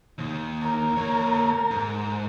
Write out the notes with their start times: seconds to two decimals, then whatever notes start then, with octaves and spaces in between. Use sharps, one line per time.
0.18 D#2 D#3
0.61 A#4
0.97 A#3 C#5
1.71 G#2